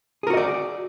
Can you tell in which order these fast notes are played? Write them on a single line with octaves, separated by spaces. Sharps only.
G#4 A#4 F#4 D#5 D5